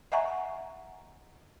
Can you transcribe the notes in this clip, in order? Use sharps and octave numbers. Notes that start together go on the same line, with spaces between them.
D#5 E5 F#5 G#5 A#5 C#6